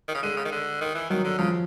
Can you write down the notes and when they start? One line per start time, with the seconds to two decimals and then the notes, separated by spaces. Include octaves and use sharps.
0.08 D#3
0.15 C#3
0.22 D3 G#3
0.37 C#3
0.45 D#3
0.52 D3
0.81 D#3
0.95 E3
1.10 D#3 F#3
1.24 D3
1.38 C#3 F3